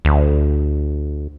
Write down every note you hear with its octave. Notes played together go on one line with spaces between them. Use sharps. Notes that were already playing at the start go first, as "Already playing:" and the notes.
D2